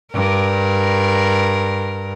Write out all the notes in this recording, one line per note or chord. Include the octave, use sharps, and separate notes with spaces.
G2 A#4